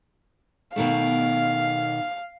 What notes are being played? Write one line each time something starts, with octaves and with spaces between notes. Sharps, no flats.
B2 D#3 A3 F5